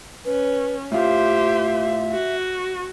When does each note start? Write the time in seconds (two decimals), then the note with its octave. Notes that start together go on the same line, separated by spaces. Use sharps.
0.25 C#4 B4
0.92 A2 F4 G4 C5 E5
2.13 F#4